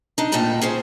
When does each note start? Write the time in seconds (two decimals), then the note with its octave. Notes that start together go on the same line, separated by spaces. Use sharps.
0.18 D4 D#4
0.32 D2 A#2 D#4 G5 A5 A#5
0.61 C#4 G#4 C5